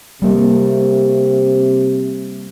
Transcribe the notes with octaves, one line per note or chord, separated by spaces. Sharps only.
C3 G3 A#3